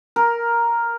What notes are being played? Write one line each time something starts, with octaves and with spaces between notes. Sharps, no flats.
A#4